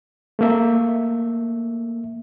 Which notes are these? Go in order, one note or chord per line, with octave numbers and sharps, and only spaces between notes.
A3 A#3 E5